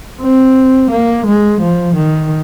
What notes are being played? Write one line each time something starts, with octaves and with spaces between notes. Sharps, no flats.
C4
A#3
G#3
F3
D#3